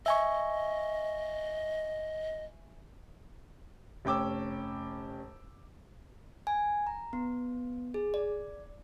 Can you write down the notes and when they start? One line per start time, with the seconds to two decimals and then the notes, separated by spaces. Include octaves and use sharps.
0.06 D#5 E5 G#5 C#6
4.05 F1 C#4 G5 D6 E6
6.47 G#5
6.87 A#5
7.13 B3
7.94 G#4
8.14 D5